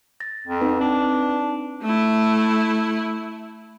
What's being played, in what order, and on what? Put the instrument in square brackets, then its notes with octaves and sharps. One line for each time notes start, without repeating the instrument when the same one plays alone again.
[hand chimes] A6 A#6
[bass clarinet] F2
[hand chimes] C4 D#4 B4
[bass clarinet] D4
[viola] A3 E4